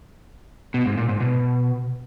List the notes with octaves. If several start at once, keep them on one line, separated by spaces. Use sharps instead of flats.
B2
G#2
A#2
G#2
B2